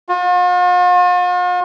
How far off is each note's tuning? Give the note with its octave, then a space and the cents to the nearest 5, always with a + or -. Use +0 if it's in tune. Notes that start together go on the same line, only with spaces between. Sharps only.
F4 +45